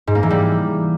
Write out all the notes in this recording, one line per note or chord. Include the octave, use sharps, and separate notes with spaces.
G#2
A#3
E3
G3